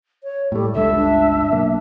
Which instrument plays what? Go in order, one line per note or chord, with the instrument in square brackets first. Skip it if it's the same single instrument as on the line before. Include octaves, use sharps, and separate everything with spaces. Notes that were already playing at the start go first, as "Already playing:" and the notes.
[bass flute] C#5
[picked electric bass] A2 A3 [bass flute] G3
[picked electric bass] G1 C#2 G2 [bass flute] A4 [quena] E5
[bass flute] D4
[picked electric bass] B1 A#3